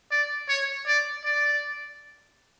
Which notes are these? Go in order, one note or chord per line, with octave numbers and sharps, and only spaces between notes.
D5
C#5
D5
D5